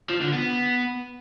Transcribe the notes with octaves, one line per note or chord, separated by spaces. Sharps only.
F3
D3
B3